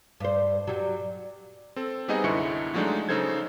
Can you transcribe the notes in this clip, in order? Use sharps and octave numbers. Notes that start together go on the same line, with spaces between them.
G2 C5
F#3 G3
C4 A4
G3 B3 C4 D#4 G#4 D#5
C2 F#2 D3 E4 C#6 C#7
F3 F#3 G#3 A3 D4 D#4
C#3 D#4 A4 C5 G#6